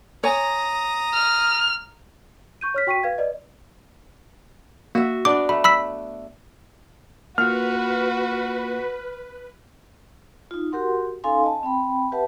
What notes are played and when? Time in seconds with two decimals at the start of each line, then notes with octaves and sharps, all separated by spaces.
0.24 C#5 G#5 A#5 D#6
1.13 F6
2.61 C#6 G6 D#7
2.74 C#5 F6 B6
2.87 F#4 G5 C#6 B6 C7 D#7
3.03 B4 F5 G#6
3.18 B4 D5 D#5
4.95 A#3 F#4 E5
5.25 B3 D4 D5 D6
5.49 A3 B5
5.64 B5 E6 B6
7.38 A#3 F4 F#4 B4 F#5 F6
10.51 D#4 F4
10.72 F#4 G4 A#4 F#5 C6
11.24 C#4 D#4 A4 F5 G#5 C6
11.43 D#5 A5
11.63 C4 G5 B5
12.12 G4 B4 E5 F#5 A5